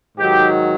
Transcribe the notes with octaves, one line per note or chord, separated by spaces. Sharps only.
G#2 D#3 F#3 G4